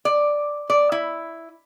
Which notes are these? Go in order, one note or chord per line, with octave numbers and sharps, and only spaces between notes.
D5
D5
E4